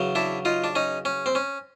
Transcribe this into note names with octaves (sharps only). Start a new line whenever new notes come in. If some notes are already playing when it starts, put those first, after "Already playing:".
Already playing: E2 C#3 F#3
D4 E4
D#4 F4
D4
C#4 D#4
C#4
C4
C#4